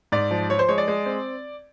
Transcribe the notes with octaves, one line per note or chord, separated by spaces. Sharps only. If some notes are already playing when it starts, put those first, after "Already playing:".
G#2 D5
F3
F3 C#5
C5
G#3 C#5
D5
G#3
C4